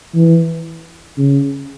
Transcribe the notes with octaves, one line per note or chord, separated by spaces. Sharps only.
E3
C#3